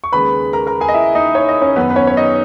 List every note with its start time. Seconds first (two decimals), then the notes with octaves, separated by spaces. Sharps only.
0.04 C#6
0.12 D#2 C#3 G#3 B4 B5
0.53 A#4 A#5
0.67 A#4 A#5
0.81 G#4 G#5
0.89 D#5
0.94 E4 E5
1.15 D#4 D#5
1.35 C#5
1.49 D#5
1.62 C#4 C#5
1.76 F#2 D#3 F#3 B3 B4
1.90 B4
1.96 C#4 C#5
2.07 C#5
2.17 D#4 D#5